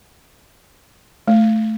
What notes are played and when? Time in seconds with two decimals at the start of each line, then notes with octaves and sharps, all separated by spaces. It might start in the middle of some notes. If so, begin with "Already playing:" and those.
1.28 A3